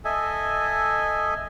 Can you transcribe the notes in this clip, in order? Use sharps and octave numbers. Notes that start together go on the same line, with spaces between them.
A4 D#5 E5 G#5